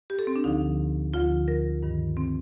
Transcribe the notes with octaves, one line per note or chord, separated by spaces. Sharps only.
G4
A4
C4
D4
D2 D3 F3 D#4
D2 D3 F3 F4
A#4
G2 D#3
C4